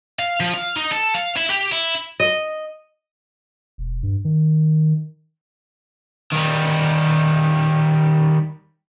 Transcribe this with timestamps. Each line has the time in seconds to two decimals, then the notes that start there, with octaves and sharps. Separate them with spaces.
0.19 F5
0.40 F3
0.54 F5
0.76 D#4
0.92 A4
1.14 F5
1.36 E4
1.49 G4
1.72 E4
2.20 D#5
3.78 E1
4.03 G2
4.25 D#3
6.32 D#3 G3